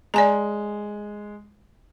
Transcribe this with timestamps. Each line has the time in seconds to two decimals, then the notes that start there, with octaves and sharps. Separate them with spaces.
0.14 G#3 D5 G#5 A#5